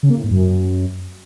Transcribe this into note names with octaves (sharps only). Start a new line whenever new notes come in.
C#3
A#3
A2
G#2
F#2